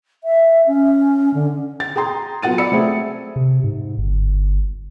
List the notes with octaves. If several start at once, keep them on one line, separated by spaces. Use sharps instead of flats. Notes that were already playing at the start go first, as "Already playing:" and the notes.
E5
C#4
D3
A6
G#4 G5 A#5 C6
F#3 B3 F4 F#5 A6 D#7
D5 B5 E6 C#7
A3 C4 G#4 E5
C3
G#2
G1